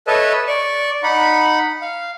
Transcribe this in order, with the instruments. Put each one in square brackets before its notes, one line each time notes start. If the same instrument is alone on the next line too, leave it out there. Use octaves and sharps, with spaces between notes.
[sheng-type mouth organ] A4 B4 C#5 D#5 E5 A5
D5 C#6
D#4 F#5 B5
F5